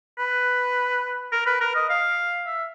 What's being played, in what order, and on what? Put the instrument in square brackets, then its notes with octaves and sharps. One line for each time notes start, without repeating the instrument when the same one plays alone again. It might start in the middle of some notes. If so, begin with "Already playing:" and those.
[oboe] B4
A#4
B4
A#4
D#5
F5
E5